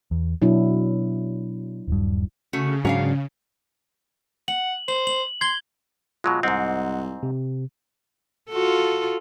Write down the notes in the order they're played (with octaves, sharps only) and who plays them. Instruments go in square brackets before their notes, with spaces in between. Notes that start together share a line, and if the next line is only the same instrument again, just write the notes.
[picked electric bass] E2
[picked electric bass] B2 [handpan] F#3 D4 E4
[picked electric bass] D#1 G2
[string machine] C#3 [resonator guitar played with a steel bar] A3 C#4 F#4
[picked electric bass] G#2 F#3 [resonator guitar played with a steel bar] C#4 D4 F5
[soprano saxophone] F#5 [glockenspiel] F#7
[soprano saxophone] C5 [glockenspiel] F#7
[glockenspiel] F#7
[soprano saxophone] C6 [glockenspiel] G#6 G7
[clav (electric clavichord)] B2 F#3 G#3 [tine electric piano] F4
[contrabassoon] C2 [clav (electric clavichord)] G#2 C4 [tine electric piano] D#5 F#5
[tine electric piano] C3
[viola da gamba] F4 F#4 A4